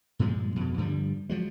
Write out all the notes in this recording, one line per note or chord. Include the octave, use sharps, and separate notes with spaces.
G2 A#2 F3 G#3
F2 B2
G2 D3 F3 G3
F3 F#3 G#3